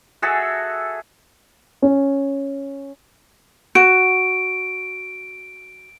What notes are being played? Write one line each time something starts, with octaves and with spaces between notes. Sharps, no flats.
F#4 G#4 A4 E5
C#4
F#4 D7